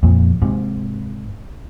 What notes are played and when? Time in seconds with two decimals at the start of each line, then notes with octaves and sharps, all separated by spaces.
0.03 F2 A#2
0.42 G#2 C3